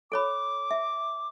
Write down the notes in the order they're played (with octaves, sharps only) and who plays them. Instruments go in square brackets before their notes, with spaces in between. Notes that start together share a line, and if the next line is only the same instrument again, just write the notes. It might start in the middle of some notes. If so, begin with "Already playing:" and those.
[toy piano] A4 C#5 B5 [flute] D6
[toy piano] E5